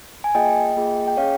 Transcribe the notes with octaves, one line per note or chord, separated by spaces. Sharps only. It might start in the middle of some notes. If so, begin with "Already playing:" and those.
G#5
A#3 F4 G#4 D#5 G5
A#3 F4 G#4
G5
C#4 G#4 C#5 F5